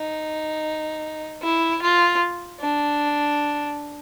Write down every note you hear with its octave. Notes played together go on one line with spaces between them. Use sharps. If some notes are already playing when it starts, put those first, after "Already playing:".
Already playing: D#4
E4
F4
D4